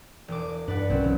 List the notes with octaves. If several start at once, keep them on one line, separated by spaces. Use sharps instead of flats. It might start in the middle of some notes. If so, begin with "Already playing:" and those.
E1 D6
G2 B4 D5 F#5
B1 A#2 F#3 C4 C#4
C#3 E3